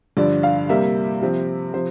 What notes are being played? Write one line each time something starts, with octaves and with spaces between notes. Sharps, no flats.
G2 D3 F3 D5
F5
C3 G3 A#3 E5
C3 F3 C4
C3 F3 C5